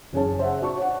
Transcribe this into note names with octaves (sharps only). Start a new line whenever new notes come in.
F#1 C#4 G#4 C#5 A5
C5 E5 F#5
F#4 D5 A5 C#6
C#5 F#5